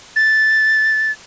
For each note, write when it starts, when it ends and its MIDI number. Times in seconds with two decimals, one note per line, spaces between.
0.16 1.11 93